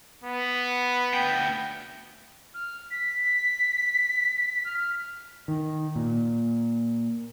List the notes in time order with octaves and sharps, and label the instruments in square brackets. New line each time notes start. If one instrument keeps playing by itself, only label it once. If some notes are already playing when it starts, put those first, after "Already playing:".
[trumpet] B3
[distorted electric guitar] D2 G5
[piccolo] F6
B6
F6
[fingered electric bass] D#3
A#2